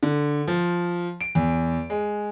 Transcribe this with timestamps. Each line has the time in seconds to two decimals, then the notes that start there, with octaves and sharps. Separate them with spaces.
0.03 D3
0.47 F3
1.21 D7
1.35 E2
1.90 G#3